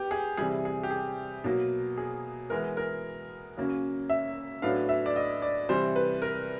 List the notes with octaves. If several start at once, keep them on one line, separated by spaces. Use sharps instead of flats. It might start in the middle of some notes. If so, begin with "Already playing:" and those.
Already playing: B3 G4
G#4
C3 E3 G3 G#4
G#4
G4
G#4
B2 F#3 A#3
G#4
E3 G#3 B3 A#4
A#4
C#3 F#3 A#3 C#4
E5
A2 F#3 B3 D4 F5
E5
D5
D#5
D5
C3 E3 G3 C5
B4
A#4